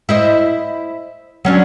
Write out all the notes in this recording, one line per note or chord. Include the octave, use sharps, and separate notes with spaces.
E4 C5 D#5
F#3 C#4 D4